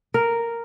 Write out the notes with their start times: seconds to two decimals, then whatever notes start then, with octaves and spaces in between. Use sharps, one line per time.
0.14 A#4